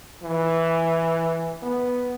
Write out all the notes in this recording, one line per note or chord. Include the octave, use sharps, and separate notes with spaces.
E3
B3